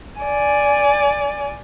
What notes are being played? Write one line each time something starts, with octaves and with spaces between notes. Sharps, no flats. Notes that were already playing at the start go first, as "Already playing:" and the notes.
D5 G#5